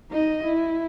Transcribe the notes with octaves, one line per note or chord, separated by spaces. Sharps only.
D#4 D#5
E4